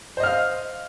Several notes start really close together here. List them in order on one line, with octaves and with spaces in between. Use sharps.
C5 D#5 F6 F5